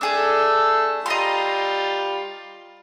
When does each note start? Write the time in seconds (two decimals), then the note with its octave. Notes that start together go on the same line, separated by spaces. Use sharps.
0.01 A3 D4 G#4 A4 E6
1.06 G3 F4 D#5 A#5 C6